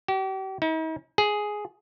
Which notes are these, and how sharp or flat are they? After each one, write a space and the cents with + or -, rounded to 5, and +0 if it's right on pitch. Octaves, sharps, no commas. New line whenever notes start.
G4 -40
D#4 +45
G#4 +5